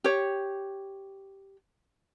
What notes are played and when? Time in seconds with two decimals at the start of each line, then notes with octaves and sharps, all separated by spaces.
0.04 G4 C#5